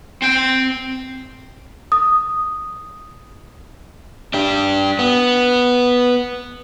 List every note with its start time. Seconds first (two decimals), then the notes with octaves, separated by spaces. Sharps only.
0.22 C4 G5
1.92 D#6
4.34 D4 G4
4.99 B3